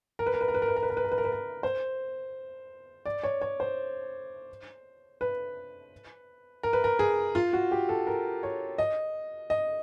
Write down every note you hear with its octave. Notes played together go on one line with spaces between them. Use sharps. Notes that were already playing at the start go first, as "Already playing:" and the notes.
A#4
B4
A#4
B4
A#4
B4
A#4
B4
A#4
B4
A#4
B4
A#4
B4
A#4
B4
A#4
C5
D5
C#5
C#5
C5
B4
A#4
B4
A#4
G#4
F4
F#4
G4
A4
A#4
C#5
D#5
D#5